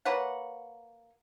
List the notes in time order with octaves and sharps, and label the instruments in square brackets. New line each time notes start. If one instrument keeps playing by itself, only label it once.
[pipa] A#3 B4 C#5 F#5